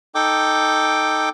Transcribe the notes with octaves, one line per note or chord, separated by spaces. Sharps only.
D#4 A4 G5 D6